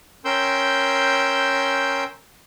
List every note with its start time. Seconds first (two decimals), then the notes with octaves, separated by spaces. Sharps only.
0.25 C#4 A#4 G5 C6 E6 G6